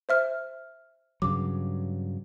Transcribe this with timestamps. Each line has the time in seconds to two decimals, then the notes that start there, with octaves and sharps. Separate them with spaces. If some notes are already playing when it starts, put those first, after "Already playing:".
0.09 C5 E5 F6
1.22 G2 C#3 F#3 D6